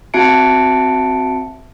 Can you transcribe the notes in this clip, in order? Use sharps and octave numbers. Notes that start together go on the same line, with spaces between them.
C4 F#4 E5 A5 C#7 D7